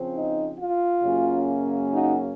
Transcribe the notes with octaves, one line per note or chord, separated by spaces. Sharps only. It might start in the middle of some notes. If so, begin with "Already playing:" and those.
Already playing: C#3 F3 C4
D#4
F4
F#2 C#3 F#3 A#3 C#4
D#4 F#4